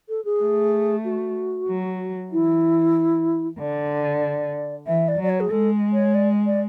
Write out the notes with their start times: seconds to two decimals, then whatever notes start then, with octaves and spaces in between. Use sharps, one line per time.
0.09 A4
0.25 G#4
0.41 A3
1.05 F#4
1.69 F#3
2.32 E3 E4
3.59 D3 D5
4.86 E3 E5
5.08 D5
5.19 F#3 D5
5.29 C#5
5.40 G#4
5.51 G#3 A4
5.93 C#5
6.14 D5
6.46 D5